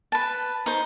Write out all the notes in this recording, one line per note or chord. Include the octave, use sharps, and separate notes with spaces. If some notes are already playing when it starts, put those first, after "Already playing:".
B4 A5
D#4 C5